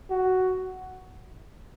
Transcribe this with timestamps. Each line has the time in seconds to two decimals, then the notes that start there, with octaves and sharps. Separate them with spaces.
0.10 F#4